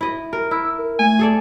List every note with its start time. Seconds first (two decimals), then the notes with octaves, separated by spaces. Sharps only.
0.01 E4 D#5
0.33 A#4
0.51 E4 E6
0.79 A#4
0.99 A3 G#5
1.19 G#4 A4 D5